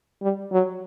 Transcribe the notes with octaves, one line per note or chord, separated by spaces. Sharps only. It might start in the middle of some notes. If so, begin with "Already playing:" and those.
G3
F#3